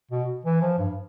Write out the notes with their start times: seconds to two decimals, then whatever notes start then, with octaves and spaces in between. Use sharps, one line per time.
0.12 B2
0.45 E3
0.62 F3
0.79 G2